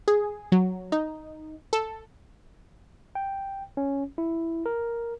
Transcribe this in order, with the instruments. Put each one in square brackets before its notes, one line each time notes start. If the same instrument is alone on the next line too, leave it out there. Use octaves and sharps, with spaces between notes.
[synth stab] G#4
F#3
D#4
A4
[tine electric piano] G5
C#4
E4
A#4